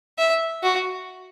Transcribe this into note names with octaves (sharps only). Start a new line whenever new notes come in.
E5
F#4